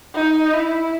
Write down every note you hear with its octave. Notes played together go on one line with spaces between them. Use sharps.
D#4
E4